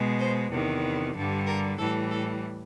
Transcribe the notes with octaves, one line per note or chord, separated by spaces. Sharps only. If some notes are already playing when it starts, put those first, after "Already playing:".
Already playing: B2 G#3
C5
E2 C3 D#3
G2 D3 G3
A#4
A2 E3 G3 A4
A4